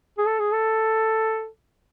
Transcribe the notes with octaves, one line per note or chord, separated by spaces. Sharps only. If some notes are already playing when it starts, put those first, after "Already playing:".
G#4
A4
G#4
A4